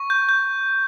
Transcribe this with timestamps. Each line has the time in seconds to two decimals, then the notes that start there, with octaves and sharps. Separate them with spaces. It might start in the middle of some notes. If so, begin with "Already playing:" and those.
Already playing: C#6
0.10 G6
0.29 G6